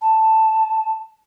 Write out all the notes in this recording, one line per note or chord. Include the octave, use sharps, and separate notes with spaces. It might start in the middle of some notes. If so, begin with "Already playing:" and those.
A5